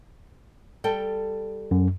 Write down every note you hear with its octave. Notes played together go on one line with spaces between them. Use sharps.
G3 A4 G5
F#2